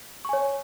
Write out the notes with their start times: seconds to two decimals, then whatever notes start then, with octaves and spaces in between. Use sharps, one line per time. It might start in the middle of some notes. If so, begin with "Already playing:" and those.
0.25 C#6
0.29 G#5
0.33 C#5